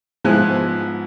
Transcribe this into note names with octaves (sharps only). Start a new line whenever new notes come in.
G#2 F3 B3 E4 G#5 F#6